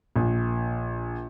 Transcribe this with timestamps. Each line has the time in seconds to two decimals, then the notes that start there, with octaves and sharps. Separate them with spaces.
0.16 A#1